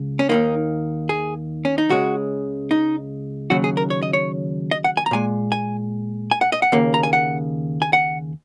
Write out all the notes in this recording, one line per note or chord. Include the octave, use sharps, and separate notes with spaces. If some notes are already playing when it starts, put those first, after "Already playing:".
Already playing: C#2 C#3
C#4
D#2 D#3 A#3 D#4
G#4
C#4
D#4
C#2 C#3 G#3 F#4
D#4
D#2 C#3 F#3 F#4
G#4
A#4
C#5
D#5
C#5
D#5
F#5
G#5
A#5
A#2 G#3 G#5
G#5
G#5
F#5
D#5
F#5
D#2 C#3 A#3
A#5
G#5
F#5
G#5
F#5